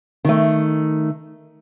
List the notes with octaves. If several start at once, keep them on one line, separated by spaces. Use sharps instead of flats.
D#3 A3